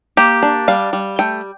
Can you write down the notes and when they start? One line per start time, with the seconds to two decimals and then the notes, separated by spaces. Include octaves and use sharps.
0.17 A#3 G4
0.43 D4
0.68 G3 F5
0.93 G3
1.19 A3 G5